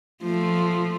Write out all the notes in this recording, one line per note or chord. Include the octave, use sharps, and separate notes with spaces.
F3 A3